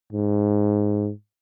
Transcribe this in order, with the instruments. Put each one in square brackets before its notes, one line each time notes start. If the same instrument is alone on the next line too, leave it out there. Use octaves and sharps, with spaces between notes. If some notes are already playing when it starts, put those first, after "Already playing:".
[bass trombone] G#2